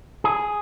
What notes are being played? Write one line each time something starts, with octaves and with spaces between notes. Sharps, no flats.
G#4